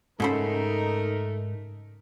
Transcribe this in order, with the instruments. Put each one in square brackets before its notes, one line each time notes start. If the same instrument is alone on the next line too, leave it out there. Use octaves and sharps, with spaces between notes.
[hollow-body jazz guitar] G#2 B5 [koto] C#3 A4 C5 [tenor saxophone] A3 [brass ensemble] D#4 A#4